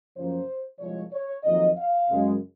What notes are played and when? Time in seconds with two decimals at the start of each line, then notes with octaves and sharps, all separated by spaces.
0.15 F#2 C#3 F3 A#3 C5
0.79 C2 A#2 F3 G#3 C#5
1.12 C#5
1.44 F2 D#3 F#3 A#3 D#5
1.77 F5
2.09 F#2 C#3 G#3